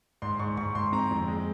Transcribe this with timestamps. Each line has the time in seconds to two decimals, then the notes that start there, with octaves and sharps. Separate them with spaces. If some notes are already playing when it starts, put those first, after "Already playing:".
0.22 G#2 C6
0.39 G#2 C#6
0.57 G#2 C#6
0.75 G#2 C6
0.92 C4 A#5
1.11 F2
1.28 G#3